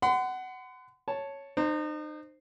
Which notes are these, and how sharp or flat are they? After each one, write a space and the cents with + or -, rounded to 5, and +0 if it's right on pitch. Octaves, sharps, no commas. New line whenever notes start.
F#5 +15 C6 -45
C#5 +0 A5 +0
D#4 -35 C5 +0